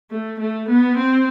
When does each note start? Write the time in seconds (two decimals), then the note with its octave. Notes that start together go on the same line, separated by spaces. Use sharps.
0.10 A3
0.39 A3
0.68 B3
0.97 C4